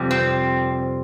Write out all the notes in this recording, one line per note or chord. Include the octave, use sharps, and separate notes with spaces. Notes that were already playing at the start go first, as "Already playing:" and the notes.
Already playing: F2 C3 G3
C4